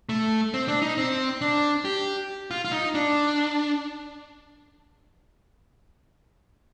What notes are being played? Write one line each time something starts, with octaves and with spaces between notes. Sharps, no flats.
A3
C4
D4
D#4
C4
D4
G4
F4
F4
D#4
D4